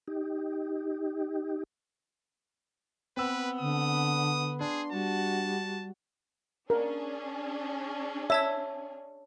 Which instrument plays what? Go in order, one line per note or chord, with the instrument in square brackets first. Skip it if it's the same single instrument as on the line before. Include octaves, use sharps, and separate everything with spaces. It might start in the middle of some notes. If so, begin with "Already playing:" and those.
[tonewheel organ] D#4 G4
[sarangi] B3 [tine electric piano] C4 E6 [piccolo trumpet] B4
[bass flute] D3 [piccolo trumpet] D#6
[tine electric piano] D4 [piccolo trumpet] G#4 [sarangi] C6
[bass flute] G3 [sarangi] F#4 [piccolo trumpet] A5
[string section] C#4 D4 G#4 [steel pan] A#4
[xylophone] C#5 A5 G#6 [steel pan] E5